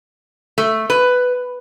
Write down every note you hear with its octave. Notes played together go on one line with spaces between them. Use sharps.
A3
B4